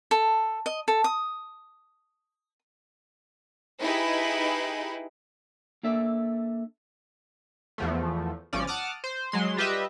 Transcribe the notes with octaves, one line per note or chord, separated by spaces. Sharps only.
A4
D#5
A4
D#6
D#4 E4 G4 G#4 B4
A#3 D4 A4 D5 E5
E2 F3 A3
G#1 F3 C#4 D5
F#5 A5 D6 D#6 F6
C5
F#3 G#3 C6
G3 F4 G4 B4 D#5 E5